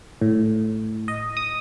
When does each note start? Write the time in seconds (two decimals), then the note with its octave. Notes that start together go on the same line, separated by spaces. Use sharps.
0.21 A2
1.08 D#5
1.37 D#6